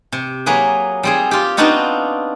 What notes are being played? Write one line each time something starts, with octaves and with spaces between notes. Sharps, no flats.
C3
F#3 A#3 G#4 B4
G3 C4 G#4
F4 G4
B3 C4 D4 D#4 F4 F#4